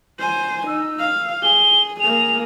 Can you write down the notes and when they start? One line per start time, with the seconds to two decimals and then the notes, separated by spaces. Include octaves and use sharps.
0.19 C5 G#5
0.67 D#4 E6
1.00 F5
1.43 G#4 G7
2.00 A#3 G#4 F7